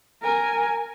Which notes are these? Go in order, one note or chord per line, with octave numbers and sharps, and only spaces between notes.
A#4 G#5